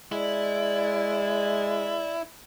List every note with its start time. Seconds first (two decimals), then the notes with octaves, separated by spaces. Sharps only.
0.12 G#3 E4 D5